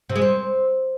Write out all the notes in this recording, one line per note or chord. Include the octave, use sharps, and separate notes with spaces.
C3
G#3
C4